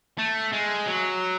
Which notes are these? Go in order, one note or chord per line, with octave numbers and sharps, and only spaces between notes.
A3
G#3
F#3